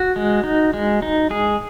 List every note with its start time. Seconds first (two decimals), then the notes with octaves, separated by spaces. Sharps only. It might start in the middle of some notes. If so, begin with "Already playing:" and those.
Already playing: F#4
0.16 G#3
0.44 D#4
0.74 G#3
1.02 D#4
1.30 G#3 G#4